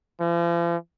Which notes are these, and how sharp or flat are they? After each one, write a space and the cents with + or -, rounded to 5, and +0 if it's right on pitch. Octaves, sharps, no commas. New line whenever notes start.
F3 -45